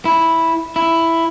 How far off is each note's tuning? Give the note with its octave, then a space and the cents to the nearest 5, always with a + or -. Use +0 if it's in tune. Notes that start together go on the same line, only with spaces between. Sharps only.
E4 -5
E4 +5